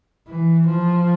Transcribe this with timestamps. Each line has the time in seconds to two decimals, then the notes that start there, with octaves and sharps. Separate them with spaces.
0.28 E3
0.66 F3